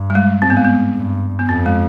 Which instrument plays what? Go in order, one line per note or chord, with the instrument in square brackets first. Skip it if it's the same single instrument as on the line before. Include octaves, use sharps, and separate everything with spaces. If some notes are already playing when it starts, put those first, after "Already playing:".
Already playing: [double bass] G2
[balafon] G3
G#3
[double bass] G#2 [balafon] C4
[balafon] B3
G#3
B3
[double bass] G2
[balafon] B3
[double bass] F2 [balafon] C4
[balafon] G#3